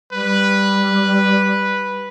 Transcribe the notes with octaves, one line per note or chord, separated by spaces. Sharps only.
G3 B4